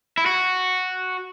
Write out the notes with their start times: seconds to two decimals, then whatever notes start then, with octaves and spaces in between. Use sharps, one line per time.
0.18 E4
0.26 F#4